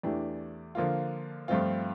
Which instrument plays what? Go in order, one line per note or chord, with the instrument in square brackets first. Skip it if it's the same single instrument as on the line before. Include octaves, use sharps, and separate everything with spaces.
[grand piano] E2 E3 A3 D4 G4
D3 F3 A#3 F4
G2 F3 A3 C4 F4